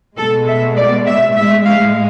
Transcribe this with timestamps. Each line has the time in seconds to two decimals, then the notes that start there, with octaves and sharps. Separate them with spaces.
0.18 B2 G#3 A4
0.47 E5
0.77 D5
1.07 E5
1.36 A2 G#3 E5
1.66 F5